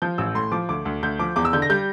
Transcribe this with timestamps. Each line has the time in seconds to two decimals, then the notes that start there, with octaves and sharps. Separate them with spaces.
0.02 F3 G6
0.18 A1 E6
0.35 A2 C6
0.52 F3 D6
0.69 D2 D6
0.85 D2
1.03 D2 G6
1.19 F3 D6
1.36 E2 D6
1.45 E6
1.53 D3 G6
1.62 A#6
1.70 G3 G6